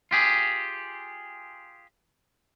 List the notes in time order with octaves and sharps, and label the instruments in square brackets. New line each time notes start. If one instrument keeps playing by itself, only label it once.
[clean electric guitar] F4 G4 G#4